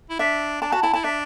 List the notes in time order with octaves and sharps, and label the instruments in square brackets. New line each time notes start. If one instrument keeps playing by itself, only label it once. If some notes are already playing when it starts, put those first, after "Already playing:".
[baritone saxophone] E4
[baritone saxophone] D4 [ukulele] E5
[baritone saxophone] D4 [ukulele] A5
[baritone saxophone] F#4 [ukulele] A5
[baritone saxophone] E4 [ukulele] A5
[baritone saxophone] E4 [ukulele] A5
[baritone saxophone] D4 [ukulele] E5